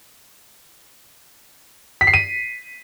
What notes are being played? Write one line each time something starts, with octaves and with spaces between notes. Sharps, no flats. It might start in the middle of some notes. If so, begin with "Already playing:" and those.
B6
C7
D#7